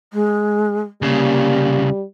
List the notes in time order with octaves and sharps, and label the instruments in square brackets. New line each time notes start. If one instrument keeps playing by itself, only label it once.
[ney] G#3
[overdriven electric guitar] C2 C#3 [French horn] G3 [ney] A#3